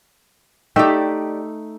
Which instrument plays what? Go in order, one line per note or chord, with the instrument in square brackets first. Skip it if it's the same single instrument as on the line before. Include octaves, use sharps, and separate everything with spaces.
[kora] A3 D#4 E5 [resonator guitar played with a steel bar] G4 D5 G5